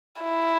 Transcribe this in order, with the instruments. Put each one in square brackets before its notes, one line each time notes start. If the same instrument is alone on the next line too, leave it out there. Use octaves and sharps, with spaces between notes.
[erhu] E4